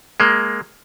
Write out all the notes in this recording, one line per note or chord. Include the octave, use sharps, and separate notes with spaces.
G#3 A#3